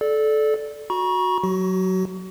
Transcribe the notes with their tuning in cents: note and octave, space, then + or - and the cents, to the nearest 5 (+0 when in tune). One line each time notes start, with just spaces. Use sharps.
A4 -20 D5 +0
F#4 -15 A#5 +45 C#6 +0
F#3 +0 F#4 +30